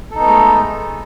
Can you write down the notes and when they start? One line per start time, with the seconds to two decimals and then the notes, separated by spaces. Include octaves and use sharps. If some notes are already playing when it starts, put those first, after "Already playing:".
0.11 A4
0.15 D#4
0.19 B3
0.23 A3
0.28 G#3